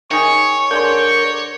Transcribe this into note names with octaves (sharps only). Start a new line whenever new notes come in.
D#3 G#4 C#5 C#6
D3 G#4 A#4 D5 C6 G6